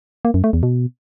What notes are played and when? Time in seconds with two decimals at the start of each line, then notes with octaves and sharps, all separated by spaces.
0.25 A#3
0.34 F#2
0.44 A3
0.53 E2
0.63 B2